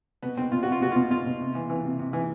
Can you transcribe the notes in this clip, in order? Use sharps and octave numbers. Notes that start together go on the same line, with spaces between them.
B2 B3
B2 C4
B2 F4
B2 F#4
F4
B2 F#4
B2 F4
B2 F4
B2
C3
E3
E3
C3
C3
E3